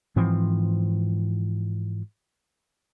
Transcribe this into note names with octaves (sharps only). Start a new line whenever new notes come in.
G#2 E3 F3 C4